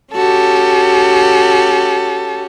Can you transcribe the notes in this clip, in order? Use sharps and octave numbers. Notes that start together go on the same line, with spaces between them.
C#4 F#4 G4 A4